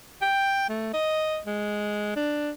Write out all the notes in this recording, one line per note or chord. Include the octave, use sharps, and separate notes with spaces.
G5
A3
D#5
G#3
D4